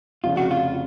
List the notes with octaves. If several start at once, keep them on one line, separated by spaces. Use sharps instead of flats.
F1 F2 C#3 F4
F#4
F4